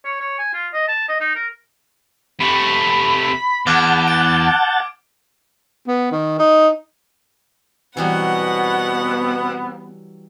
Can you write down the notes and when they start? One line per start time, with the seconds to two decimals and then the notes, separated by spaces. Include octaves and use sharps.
0.05 C#5
0.20 C#5
0.39 G#5
0.54 F4
0.74 D#5
0.88 A5
1.08 D#5
1.20 D#4
1.35 A#4
2.40 C3 A3 B5
3.67 E2 F#5 A5 D6 F6 G6 G#6
4.08 D7
5.87 B3
6.12 D#3
6.39 D#4
7.97 B2 E3 F#3 G3 B3 C4 F#5